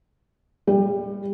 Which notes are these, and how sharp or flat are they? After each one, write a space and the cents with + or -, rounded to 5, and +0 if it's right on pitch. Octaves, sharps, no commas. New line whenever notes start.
G3 +25